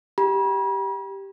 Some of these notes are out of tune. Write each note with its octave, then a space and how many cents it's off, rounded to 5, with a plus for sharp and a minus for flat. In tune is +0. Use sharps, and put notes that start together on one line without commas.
G4 +0 B5 -45